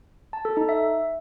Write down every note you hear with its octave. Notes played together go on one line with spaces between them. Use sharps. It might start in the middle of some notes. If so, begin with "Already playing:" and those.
A5
A4
D#4
E5